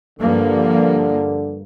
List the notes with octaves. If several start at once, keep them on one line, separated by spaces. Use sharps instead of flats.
G2 D3 F3 A#3